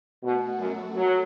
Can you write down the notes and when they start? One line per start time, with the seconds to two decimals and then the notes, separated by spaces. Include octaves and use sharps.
0.22 B2 A3 F#4 A4
0.59 F#2
0.95 F#3